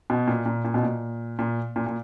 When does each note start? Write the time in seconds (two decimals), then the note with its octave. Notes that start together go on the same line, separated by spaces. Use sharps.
0.10 B2
0.28 A#2
0.46 A#2
0.65 A#2
0.74 B2
0.83 A#2
1.39 A#2
1.76 A#2
1.87 A#2